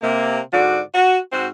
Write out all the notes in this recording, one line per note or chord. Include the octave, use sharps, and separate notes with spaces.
C3 A#3
G#2 D3 F#4 D5
F#4
G#2 C4 F#4